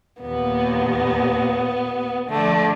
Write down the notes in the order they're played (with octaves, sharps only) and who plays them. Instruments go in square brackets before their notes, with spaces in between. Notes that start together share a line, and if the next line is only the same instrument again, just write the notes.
[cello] D#2 A#2 [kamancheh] B3
[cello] D3 F3 [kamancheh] A3 D5